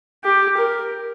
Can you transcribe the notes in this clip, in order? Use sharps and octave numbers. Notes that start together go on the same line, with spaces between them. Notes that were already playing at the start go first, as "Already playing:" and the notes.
G4
A#4